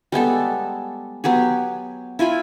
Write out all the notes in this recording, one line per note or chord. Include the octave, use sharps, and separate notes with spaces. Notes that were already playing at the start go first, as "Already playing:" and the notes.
G3 G#3 B3 A4
F#3 B3 G4 G#4
E4 F4 G#5 B5